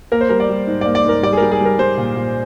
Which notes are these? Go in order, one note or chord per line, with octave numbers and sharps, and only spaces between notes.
A#3 A#4
C5
G3 A#4
D5
G3
G#2
A#3 D5
D5
G#2 A#4
G3 D5
G#4
G3 A#4
G#4
G3
A#4
G3 C5
A#2
A#2